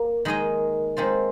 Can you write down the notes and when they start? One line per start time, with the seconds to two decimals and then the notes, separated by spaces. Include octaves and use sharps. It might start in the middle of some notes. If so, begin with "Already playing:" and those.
Already playing: A#3
0.25 D#3 G#3 D#4 G#4 D#5
0.97 D#3 G#3 C4 F4